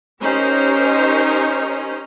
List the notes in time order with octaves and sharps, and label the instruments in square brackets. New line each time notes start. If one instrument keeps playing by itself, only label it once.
[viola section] C#4 D#4 G4 A#4 C5